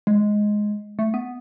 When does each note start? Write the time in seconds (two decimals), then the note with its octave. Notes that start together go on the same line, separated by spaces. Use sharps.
0.07 G#3
0.99 A3
1.14 B3